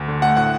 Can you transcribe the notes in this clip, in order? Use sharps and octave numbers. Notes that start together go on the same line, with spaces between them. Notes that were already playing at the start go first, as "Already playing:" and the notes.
Already playing: D2
D3
A3 F#5
A2 F#5